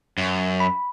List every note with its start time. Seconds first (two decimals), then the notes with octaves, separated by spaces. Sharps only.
0.18 F#2
0.60 B5